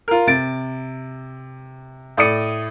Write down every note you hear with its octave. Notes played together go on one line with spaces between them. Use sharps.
F4 A#4
C3 A6 D7
A2 D5 D#6 C#7 D#7